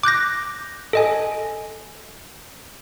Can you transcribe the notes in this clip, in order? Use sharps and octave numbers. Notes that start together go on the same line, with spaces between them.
D6 F#6 G6 A#6
A4 D#5 G#5